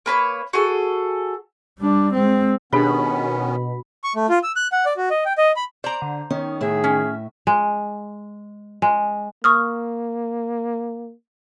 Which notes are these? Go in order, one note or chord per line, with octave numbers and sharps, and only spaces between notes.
A#3 B4 C#5
F#4 G#4 A4
G3 D4
G#3 C4
B2 D#3 B3 C#4 D4 G4 G#4 B5
C#6
A3
F4
E6
F#6
F#5
D5
F#4
D#5
G5
D#5
B5
C5 D5 A#5
D3
D#3 C#4
A2 G#4 E5
C#4
G#3
G#3
A#3 C#6 D#6 F6